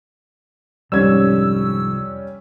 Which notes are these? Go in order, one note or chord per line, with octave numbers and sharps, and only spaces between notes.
C2 F2 G#2 G3 C#4 E6 G#6